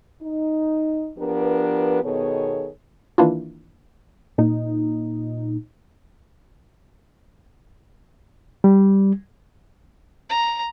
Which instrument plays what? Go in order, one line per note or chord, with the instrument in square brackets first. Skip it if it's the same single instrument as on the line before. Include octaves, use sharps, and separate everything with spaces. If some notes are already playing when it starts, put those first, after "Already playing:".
[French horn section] D#4
F3 B3 D4 G4 A#4 B4
B2 D#3 B3 G#4 A4 C#5
[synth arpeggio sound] D#3 E3 A#3 D4 E4 F4
A#2 D#4
[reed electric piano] G3
[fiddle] A#5